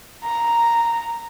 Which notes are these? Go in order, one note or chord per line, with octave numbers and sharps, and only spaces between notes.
A#5